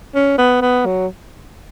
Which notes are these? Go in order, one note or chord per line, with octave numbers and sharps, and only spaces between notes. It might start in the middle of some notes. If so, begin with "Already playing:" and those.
C#4
B3
B3
F#3